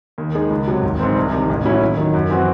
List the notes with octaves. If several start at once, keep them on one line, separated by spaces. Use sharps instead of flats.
D#2
D#3 G#3 D#4 G#4
C#2
C3 F#3
G#1
G#2 E3 C4
C2
C3 D#3
A1
A2 F#3 C#4 E4
D#2
D#3 F#3
F#2
E3 C4 F#4